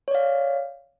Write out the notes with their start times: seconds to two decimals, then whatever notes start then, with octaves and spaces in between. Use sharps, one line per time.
0.08 C#5
0.11 D5
0.15 F5